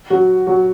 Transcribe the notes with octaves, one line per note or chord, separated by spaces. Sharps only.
F#3 F#4
F#3 F#4